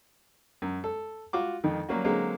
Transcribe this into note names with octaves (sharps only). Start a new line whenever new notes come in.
F#2
A4
F4 F#4 D6
F2 D#3
F#3 G3 A#3 C#4 F#4
D3 F#3 G#3 A#3 C4